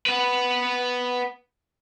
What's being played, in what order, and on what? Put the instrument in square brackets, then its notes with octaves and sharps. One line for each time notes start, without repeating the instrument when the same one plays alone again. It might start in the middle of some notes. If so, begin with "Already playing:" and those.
[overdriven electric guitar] B3 B4